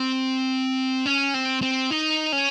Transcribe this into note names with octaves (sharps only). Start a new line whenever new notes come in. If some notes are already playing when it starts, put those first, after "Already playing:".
Already playing: C4
C#4
C4
C4
D#4
C#4